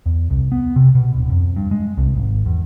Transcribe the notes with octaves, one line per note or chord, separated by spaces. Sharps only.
E2
C2
B3
C3
B2
D1
F2
G2
G#3
C2
G#1
E2